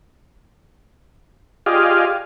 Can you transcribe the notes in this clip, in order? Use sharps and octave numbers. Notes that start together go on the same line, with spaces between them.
F4 G4 G#4 D5 D#5 F5